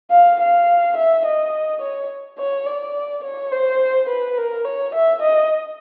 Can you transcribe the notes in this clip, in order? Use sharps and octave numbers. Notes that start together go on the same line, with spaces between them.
F5
F5
E5
D#5
C#5
C#5
D5
C#5
C5
B4
A#4
C#5
E5
D#5